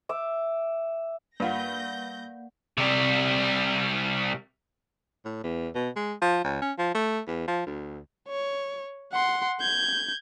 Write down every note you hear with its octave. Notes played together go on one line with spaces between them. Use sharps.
E5 D6
G2 A#3 F4 D5 F5 F#5 G6 A#6
C3 G3
A2
E2
B2
G#3
F3
C#2
C#4
F3
A3
E2
F3
D2
C#5
F#5 C6
G6 G#6